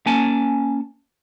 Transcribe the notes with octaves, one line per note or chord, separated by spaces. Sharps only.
A#3 C#4 G#5 A5